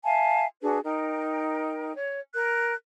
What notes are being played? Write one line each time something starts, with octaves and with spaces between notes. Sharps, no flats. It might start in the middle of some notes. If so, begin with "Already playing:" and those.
E5 F5 G#5 A5
D4 F#4 G#4 B4
D#4 A#4 G5
C#5
A#4 F#6